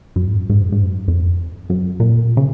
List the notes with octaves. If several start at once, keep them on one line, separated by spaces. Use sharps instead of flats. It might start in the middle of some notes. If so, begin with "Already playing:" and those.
F#2
G#2
F#2
G#2
F#2
G#2
F#2
F2
F#2
A#2
C#3